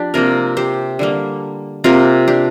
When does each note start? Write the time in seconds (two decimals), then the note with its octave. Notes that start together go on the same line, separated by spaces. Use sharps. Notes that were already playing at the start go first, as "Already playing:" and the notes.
Already playing: F3 D4 G4
0.14 C3 A#3 F4 A#4
0.57 G4 C5
0.99 D3 G3 A#3
1.84 C3 A#3 F4 A#4
2.28 D4 G4